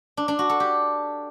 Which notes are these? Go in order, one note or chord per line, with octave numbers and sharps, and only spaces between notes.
D4
D4
F#4
A4
G4